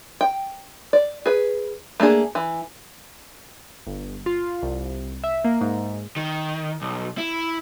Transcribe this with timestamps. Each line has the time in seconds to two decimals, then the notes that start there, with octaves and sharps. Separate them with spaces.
0.21 G5
0.93 D5
1.26 G#4 B4
2.00 A3 A#3 D4 G#4
2.35 E3
3.87 G1
4.26 F4
4.63 C2
5.24 E5
5.45 A#3
5.61 G#2
6.16 D#3
6.82 B1
7.18 E4